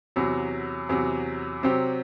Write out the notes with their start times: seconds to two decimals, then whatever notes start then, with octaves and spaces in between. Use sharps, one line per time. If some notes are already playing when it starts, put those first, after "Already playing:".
0.16 E2 C3 F#3
0.89 E2 C3 F#3
1.63 C3 F#3 C4 G4